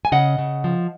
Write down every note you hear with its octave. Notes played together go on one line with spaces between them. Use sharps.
G#5
C#3 D#5 F#5
C#3
F3